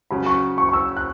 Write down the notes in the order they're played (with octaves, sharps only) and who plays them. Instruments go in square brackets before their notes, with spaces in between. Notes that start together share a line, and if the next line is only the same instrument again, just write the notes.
[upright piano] C#3 F#3 C#4 [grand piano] B5
[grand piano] C#6
C#6
C#6
E6
F#6